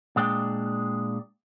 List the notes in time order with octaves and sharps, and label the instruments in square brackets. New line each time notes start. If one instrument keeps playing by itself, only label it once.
[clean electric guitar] A#2 G#3 D4 G5